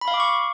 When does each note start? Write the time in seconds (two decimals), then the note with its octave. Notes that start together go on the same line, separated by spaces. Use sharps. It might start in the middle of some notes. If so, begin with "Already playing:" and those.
0.01 B5
0.08 F5
0.14 D6
0.20 C#6